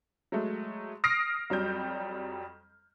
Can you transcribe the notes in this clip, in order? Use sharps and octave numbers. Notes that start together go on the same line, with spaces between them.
F#3 G#3 A3
D#6 F6 A#6 C7 D7
F2 F#3 G3 G6